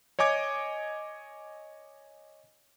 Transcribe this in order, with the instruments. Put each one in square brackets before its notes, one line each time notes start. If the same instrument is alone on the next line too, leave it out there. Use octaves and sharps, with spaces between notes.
[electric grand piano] C#5 D#5 G#5 D6 G#6